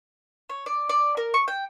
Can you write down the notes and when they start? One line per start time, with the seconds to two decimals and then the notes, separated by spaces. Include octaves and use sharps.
0.50 C#5
0.66 D5
0.89 D5
1.17 A#4
1.34 C#6
1.48 G5